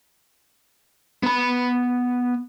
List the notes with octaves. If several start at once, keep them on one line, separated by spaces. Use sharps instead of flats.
B3 B5